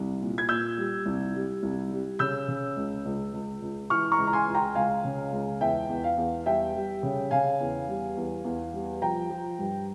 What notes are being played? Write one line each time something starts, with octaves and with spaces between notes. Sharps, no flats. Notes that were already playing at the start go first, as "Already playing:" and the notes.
Already playing: C2
A#2
G#6
A#2 E6 G6
G3
C2
G3
C2
G3
C#3 E6 G6
C#3
C#2
C#2
C#2
C#2
E3 C#6 F6
A#5 C#6
C#2
A#5
G#5 C6
C#2
G5 A#5
C#2 F5 G#5
C#3
C#2
E2 E5 G5
E2
F5
E2
G3 E5 G5
G3
C#3
C#3 F5 G#5
E2
G3
E2
E2
G3
F3 G5 A#5
F3
G2